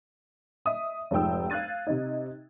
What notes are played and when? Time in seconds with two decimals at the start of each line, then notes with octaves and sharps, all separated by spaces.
0.65 D#5 E5 D#6
1.11 F1 G#2 F3 G5 E6
1.50 F5 F#6 G#6 A6 D#7
1.87 C3 D#4